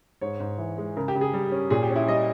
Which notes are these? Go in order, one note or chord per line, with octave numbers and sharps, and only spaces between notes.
G#2 C#5
G#2
E3
G#3
C#3 A#4
G4
C#3
G#4
G3
C#4
A#2 G#4
G4
C#4
E4
G3 D#5